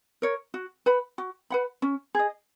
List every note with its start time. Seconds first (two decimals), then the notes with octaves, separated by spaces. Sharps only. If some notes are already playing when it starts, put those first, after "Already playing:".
0.22 A#4 C#5
0.54 F#4
0.86 B4 F#5 B5
1.18 F#4
1.50 B4 F#5 B5
1.82 C#4
2.15 G#4 D#5